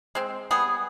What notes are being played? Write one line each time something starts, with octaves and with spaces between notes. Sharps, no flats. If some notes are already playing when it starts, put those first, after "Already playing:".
G#3 C4
G3 B3 G#4